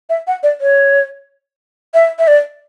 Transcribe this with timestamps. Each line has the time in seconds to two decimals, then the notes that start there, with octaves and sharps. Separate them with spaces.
0.10 E5
0.27 F#5
0.43 D5
0.61 C#5
1.94 E5
2.19 E5
2.28 D5